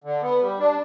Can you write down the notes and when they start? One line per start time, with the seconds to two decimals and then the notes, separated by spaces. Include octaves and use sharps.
0.04 D3
0.22 B3
0.41 G3
0.59 D4